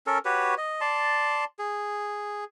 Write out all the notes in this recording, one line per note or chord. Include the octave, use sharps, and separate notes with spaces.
C#4 A4 A#4
F#4 G4 B4 C#5
D#5
D5 A5 C6
G#4